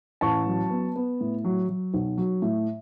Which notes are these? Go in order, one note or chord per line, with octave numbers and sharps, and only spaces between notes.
A1 A5 C#6
F#3
B3
B3
A2
F#3
F#3
B1
F#3
A2